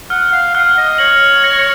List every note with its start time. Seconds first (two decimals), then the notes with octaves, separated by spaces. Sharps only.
0.10 F#5 F6
0.33 F5
0.54 F#5 F6
0.77 D#5
0.98 C#5 F#7
1.44 A#6